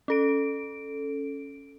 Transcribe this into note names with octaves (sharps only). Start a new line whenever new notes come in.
C#4 A4 D7